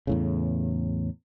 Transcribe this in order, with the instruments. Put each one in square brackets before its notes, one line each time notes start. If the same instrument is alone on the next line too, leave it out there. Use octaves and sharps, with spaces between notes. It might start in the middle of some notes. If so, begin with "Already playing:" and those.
[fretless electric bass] E2 A2 C#3